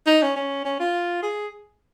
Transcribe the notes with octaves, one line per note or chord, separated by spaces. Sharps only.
D#4
C#4
C#4
C#4
F4
G#4